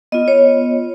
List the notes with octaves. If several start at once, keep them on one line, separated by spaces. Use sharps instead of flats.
B3 F4 D#5
C#5